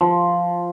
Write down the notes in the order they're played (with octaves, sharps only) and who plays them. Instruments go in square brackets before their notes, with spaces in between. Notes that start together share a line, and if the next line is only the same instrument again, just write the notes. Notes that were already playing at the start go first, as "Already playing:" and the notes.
[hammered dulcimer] F3